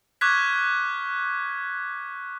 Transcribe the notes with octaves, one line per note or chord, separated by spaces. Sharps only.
C#6 D6 F6 F#6 G#6 B6